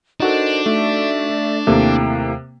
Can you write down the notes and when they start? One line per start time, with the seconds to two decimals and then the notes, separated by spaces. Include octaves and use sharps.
0.20 D4 D#4 F#4 A4 A#4 C5 D#5
0.66 A3 D5 E5
1.67 D#2 C3 A3 A#3 E4 F5 G5